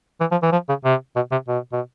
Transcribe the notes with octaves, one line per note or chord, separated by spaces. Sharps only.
E3
F3
E3
F3
C#3
C3
B2
C3
B2
B2